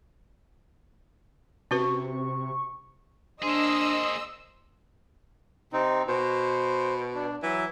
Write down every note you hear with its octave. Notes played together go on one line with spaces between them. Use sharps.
C3 C#4 F#4 B4 C#6
A#3 D4 G#4 C5 D#5 E6
C3 C4 D#4
B2 C5
D4
E3 F#3 E5